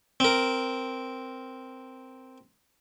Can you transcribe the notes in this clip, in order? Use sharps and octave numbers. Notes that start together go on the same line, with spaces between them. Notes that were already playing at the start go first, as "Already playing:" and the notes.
C4 A#4